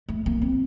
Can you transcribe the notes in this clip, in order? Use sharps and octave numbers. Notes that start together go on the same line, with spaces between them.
A3
A#3
C4